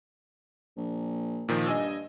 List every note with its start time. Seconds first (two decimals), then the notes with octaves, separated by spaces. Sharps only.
0.77 A#1
1.49 A#2 D#3 F3
1.67 G2 D#5 G#5 E6